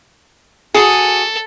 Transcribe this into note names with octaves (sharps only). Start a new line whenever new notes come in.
F#4 G#4 A4